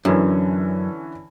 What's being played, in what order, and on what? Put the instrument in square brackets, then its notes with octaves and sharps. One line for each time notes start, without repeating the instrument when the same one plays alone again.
[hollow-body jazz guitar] F#2 [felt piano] D3 E3 C#4